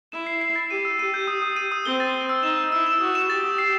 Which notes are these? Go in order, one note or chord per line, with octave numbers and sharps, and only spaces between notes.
E4 E7
C7
C7
A6
G4 D#7
E6
G4 D#7
G6
D#6
D#6
D#7
D#6
C4 G7
A6
G7
E6
D#4 E7
E6
E4 E6
E7
F#4 D#6
E7
G4 A6
D#6
C7